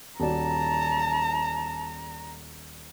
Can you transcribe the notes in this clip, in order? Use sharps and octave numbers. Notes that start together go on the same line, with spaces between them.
D#1 F#4 D5 A5 A#5